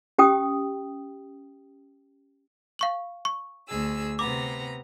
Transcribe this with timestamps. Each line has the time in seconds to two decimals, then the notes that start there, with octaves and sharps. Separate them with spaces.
0.18 C#4 G4 G5 D#6
2.79 F5 C#6 F#7
3.25 C#6
3.67 D2 G#4 E6
4.19 C3 B3 A#5 D6